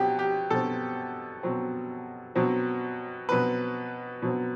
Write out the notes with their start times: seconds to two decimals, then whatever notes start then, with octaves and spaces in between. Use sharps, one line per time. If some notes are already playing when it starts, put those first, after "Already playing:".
Already playing: B2 F#3 C4 G4
0.19 G4
0.50 B2 F#3 C4 A4
1.43 B2 F#3 C4
2.35 B2 F#3 C4
3.29 B2 F#3 C4 B4
4.22 B2 F#3 C4